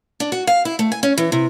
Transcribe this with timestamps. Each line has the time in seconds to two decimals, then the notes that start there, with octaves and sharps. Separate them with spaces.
0.20 D4
0.32 F#4
0.47 F5
0.65 E4
0.79 A3
0.92 G#5
1.03 C#4
1.18 E3
1.32 C3